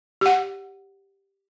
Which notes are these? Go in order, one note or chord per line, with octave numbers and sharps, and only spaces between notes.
G4 F#5